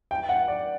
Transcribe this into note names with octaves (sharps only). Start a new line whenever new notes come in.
G5
F#5
D5